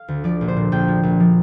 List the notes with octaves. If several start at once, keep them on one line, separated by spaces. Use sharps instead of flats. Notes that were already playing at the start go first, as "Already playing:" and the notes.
Already playing: F5
D2
F3 D5
A#1
C5
A#2
A#1 G5
F3
A#1
F3